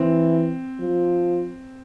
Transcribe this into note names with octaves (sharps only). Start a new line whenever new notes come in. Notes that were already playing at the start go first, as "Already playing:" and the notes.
Already playing: E3 C4
F3